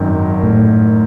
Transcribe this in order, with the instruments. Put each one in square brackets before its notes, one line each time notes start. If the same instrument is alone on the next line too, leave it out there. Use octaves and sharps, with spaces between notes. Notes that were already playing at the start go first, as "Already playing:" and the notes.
Already playing: [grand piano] G#1 F#2 D#3
[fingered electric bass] A2